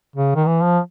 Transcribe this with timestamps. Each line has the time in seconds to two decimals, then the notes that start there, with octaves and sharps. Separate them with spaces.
0.16 C#3
0.36 D#3
0.47 E3
0.63 F3